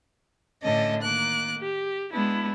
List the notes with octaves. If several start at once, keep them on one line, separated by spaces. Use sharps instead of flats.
A2 D3 C#4 D4 A4 D#5
D#3 A#3 D6 F#6
G4
G#3 B3 D4 E4